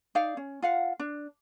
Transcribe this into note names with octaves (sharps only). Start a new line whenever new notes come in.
D#4 D5 F5
C#4
F4 F5 F#5
D4